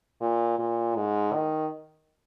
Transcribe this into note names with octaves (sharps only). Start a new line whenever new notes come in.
A#2
A#2
G#2
D#3